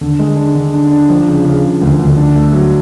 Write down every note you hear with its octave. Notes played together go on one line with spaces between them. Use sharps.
D3
G#3
D4
D3
D4
D4
F3
C#3
C#3
C#3
D2
D2
D4
A3
F#3